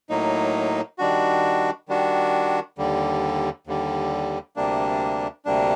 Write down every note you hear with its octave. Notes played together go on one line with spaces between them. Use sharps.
A2 F#3 A#3 D#4
D#3 G3 D4 F#4
D#3 G3 D4 F#4
D#2 D3 G3
D#2 D3 G3
D2 C3 G3 A#3 D4
D2 C3 G3 A#3 D4